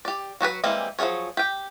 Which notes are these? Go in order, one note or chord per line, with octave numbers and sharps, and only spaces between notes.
G4 D5
F#3 F#4 G#4 B4
E3 G3 G#3 A#3 C4
F3 F#3 C#4 G#4 C#5
G4 G5